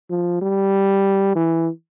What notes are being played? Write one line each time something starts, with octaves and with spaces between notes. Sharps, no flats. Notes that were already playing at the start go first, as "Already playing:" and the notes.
F3
G3
E3